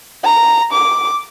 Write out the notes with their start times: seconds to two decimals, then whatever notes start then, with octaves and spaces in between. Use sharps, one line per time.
0.24 A#5
0.73 D6